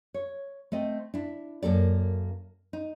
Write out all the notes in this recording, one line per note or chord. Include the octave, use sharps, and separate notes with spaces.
C#5
A3 C4 D#5
D4 E4
F#2 A#3 A4 D5
D#4